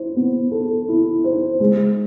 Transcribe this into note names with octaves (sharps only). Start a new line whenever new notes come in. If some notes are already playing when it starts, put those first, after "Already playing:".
Already playing: E4 C5
B3
A4
E4
C5
G#3